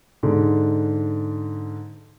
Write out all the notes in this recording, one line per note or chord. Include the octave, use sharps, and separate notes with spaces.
G#2 D3